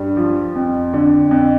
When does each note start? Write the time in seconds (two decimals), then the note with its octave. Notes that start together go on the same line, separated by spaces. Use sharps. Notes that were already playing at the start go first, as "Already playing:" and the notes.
Already playing: G2 G3
0.17 F3
0.55 F2
0.93 D3
1.31 F2